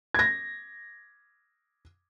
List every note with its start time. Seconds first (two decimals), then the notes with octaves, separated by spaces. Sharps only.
0.14 G#6 A#6